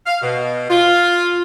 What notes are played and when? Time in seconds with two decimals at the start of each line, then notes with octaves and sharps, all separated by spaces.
0.07 F5
0.22 B2
0.70 F4